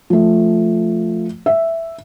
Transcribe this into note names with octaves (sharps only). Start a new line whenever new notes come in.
F3 A3
E5